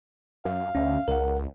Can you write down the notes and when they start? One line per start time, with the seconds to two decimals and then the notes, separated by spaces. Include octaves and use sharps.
0.45 F#2 F5
0.75 D2 C#4 E5
1.08 C#2 A#4 F#5